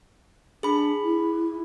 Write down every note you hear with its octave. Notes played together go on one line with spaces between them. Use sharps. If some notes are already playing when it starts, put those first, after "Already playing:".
D4 G#4 B5
E4